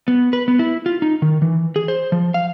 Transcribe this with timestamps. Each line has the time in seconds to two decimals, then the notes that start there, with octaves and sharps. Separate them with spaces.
0.08 B3
0.33 B4
0.48 B3
0.59 E4
0.86 F4
1.02 D#4
1.22 D#3
1.42 E3
1.76 G#4
1.88 C5
2.12 F3
2.34 F5